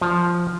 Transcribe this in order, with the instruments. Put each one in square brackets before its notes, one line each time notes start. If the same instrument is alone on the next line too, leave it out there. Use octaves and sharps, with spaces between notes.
[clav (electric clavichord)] F3